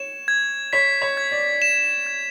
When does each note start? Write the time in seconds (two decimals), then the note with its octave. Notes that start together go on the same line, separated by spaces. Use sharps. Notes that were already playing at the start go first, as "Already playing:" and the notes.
Already playing: C#5 E7
0.28 G#6
0.73 C#5 B6
1.02 C#5
1.17 G#6
1.32 D5
1.62 E7
2.07 G#6